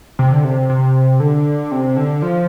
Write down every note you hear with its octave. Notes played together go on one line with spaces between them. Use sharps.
C3
D3
C3
C3
D3
C3
D3
F3